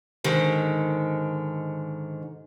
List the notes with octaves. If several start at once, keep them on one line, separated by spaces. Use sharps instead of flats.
G#2 D3 D#3